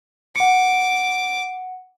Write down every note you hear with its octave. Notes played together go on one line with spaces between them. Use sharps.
F#5 D6 C#7